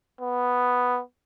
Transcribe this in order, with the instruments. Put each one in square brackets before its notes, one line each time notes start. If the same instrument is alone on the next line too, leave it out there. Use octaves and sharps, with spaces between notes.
[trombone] B3